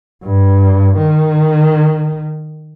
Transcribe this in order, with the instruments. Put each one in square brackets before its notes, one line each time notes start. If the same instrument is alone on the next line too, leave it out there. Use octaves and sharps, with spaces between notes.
[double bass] G2
D#3